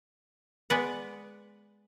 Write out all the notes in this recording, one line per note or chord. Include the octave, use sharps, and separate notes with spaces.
G#3 B3 B4 D5 F#5